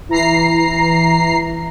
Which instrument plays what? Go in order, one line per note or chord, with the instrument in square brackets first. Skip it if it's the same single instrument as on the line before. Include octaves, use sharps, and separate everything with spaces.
[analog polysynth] E3 A#5 C7